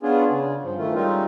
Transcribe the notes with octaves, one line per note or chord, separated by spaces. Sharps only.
B3 C#4 D4 F4 G#4
C#3
G2 F3
D#3 E3 A3 F4
G3 G#3 C4 C#4 D#4 F4